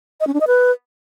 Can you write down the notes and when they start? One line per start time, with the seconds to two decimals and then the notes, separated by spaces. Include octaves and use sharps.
0.20 D#5
0.27 C#4
0.34 D4
0.41 D#5
0.47 B4